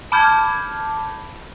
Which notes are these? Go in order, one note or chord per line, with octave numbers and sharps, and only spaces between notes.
A5 B5 D6 F6 G6 G#6